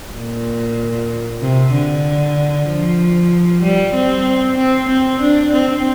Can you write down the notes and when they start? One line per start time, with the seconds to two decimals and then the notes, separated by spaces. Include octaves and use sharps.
0.14 A#2
1.41 C3
1.72 D3
2.67 F3
3.63 G3
3.94 C4
4.57 C4
4.89 C4
5.21 D4
5.52 C4